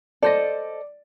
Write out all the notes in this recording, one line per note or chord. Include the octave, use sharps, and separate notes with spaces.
A4 C5 D5 D#5